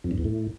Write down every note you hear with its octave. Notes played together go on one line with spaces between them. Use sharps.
F2
G2
E2
A2